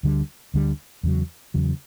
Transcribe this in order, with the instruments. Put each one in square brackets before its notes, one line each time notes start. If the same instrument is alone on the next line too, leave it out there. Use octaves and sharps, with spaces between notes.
[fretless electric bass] D2 D3 G3
D2 D3 G3
E2 C#3 F#3
E2 C#3 F#3